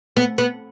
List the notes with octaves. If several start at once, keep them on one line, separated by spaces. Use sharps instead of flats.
B3
B3